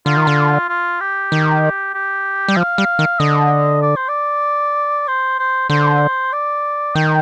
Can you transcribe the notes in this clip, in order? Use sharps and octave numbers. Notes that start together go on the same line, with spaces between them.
D3 F4
D#3
D3
F4
G4
D#3
G4
G3
F3 F5
G3
D#3
D3 D#5
D5
C5
D5
C5
C5
D3 C5
D5
D#3 G5